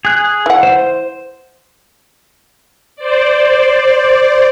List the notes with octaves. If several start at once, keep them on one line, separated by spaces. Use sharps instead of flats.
G#4 F#6
E3 F#5
C5
C5 D5